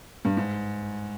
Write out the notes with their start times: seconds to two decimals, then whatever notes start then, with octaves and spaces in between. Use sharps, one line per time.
0.25 G2
0.37 G#2